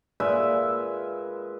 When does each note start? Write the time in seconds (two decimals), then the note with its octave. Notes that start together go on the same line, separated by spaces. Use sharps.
0.20 A#2 G#3 B4 E5